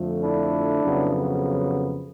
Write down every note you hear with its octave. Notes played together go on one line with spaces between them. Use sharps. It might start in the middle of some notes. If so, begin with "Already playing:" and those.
Already playing: F2 D3 F3 A3
D4 E4
F2 C#3 F#3 B3